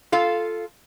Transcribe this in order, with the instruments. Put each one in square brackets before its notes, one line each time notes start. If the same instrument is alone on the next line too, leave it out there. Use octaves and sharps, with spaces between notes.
[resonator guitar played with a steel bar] F4 A4 F5